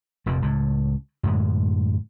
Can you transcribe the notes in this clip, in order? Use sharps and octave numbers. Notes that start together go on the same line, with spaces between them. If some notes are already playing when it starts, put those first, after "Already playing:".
F1 F2 A#2
C#2 A2
F#2 A2 D3 G#3